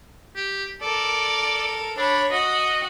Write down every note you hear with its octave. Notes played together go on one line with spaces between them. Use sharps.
G4
A4 A#4 D5
D4 C#5 B5
F#4 D#5 F#5